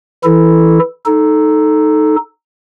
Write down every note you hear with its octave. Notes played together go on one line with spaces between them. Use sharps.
E3 E4 A4
D#4 A4